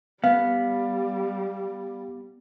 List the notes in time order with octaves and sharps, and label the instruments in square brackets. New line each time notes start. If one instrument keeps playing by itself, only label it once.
[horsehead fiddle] G3 [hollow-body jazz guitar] B3 [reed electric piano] F5